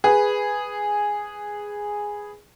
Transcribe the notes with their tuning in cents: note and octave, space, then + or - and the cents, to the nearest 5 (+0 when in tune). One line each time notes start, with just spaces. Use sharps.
G#4 -5 B4 +0